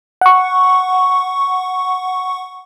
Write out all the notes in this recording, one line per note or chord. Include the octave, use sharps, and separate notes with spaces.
F#5 C#6